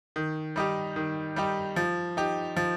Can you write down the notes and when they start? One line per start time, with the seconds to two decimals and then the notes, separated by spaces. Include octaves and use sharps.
0.16 D#3
0.56 G3 D#4 G4
0.96 D#3
1.36 G3 D#4 G4
1.76 F3
2.17 D#4 G4
2.56 F3